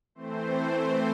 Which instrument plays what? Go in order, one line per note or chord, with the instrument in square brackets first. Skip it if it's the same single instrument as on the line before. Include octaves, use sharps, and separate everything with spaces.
[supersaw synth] E3 A3 C4 C5